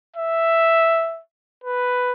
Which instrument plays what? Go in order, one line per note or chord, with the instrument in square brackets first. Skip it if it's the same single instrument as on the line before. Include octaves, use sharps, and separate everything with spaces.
[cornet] E5
B4